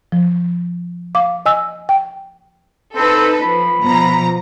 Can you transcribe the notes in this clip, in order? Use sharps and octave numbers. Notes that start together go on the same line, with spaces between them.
F3
F5 D6
D#5 G#5 E6
G5
C4 D#4 A4 B4
F3 B5
B2 F3 A#5